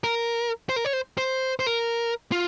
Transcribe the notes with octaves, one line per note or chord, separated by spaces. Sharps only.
A#4
C5
A#4
C#5
C5
C5
C5
A#4
F4